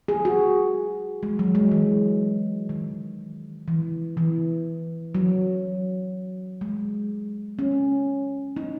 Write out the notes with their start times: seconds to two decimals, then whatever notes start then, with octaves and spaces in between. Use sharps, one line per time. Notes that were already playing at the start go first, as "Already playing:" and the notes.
0.08 G#4
0.25 F#4
1.23 G#3
1.39 F#3
1.55 G#3
1.71 E3
2.69 D#3
3.68 E3
4.17 E3
5.15 F#3
6.61 G#3
7.59 C#4
8.57 D#4